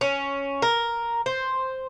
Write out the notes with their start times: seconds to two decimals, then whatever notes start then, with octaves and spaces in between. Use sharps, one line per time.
0.01 C#4
0.62 A#4
1.26 C5